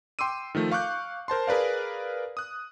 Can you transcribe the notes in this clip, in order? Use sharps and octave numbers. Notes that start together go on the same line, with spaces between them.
G5 C6 D6 E6 D#7
D#3 F3 A3
F5 C#6 D6 F#6 G6
A#4 C5 A5 C6
G#4 A#4 B4 D5 F5
D#6 F#6